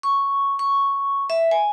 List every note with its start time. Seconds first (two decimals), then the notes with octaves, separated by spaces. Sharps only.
0.03 C#6
0.59 C#6
1.30 E5
1.51 G#5